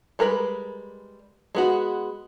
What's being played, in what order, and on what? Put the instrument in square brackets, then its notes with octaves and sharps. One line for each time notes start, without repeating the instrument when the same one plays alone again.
[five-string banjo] G3 G#3 A#4 B4
G#3 B3 F#4